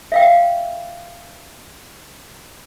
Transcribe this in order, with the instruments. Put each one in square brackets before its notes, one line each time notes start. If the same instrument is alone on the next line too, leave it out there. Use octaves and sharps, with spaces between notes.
[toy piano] E5 F5 G5